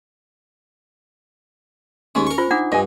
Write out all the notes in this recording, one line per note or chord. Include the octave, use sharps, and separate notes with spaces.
D#2 G#3 C#4
A#4 C#6
F4 C5
D4 D#4 F#5 D6
G2 D#5 G#5